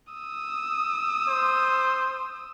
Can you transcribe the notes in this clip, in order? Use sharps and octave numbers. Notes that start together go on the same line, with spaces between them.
D#6 E6
C5